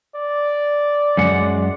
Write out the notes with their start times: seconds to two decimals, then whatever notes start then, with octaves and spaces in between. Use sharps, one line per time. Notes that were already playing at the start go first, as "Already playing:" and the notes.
0.15 D5
1.17 F#2 G#3 F#5